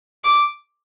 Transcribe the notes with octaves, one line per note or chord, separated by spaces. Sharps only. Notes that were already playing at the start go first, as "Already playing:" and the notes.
D6